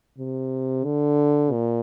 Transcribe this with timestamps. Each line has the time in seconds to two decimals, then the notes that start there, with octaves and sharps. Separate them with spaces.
0.18 C3
0.84 D3
1.52 A#2